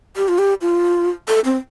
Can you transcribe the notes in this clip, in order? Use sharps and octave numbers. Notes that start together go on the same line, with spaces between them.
G4
F4
G4
F4
A4
C4